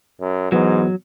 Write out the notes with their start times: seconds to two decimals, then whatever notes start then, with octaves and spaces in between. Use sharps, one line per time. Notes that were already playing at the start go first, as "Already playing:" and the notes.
0.21 F#2
0.52 G#2 E3 F#3 B3